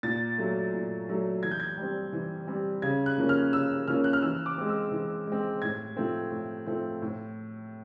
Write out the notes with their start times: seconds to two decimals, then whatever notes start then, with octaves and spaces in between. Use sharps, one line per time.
0.03 A#2 A6
0.38 F#3 A3
0.74 A#2
1.09 F#3 A3
1.43 E3 G#6
1.51 G6
1.60 G#6
1.78 G3 C4
2.13 E3
2.47 G3 C4
2.82 C#3 G#6
3.06 F#6
3.18 F3 A#3 C#4
3.29 F6
3.53 C#3 E6
3.88 F3 A#3 C#4 F6
4.04 F#6
4.13 F6
4.22 E3 E6
4.46 D6
4.58 G#3 C4
4.69 E6
4.92 E3
5.27 G#3 C4
5.62 A2 G#6
5.97 F3 A3 C4
6.31 A2
6.66 F3 A3 C4
7.02 A2